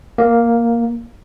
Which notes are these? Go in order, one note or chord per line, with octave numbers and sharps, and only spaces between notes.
A#3